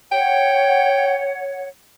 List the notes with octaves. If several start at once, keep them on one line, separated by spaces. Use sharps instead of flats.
C#5 F#5 G5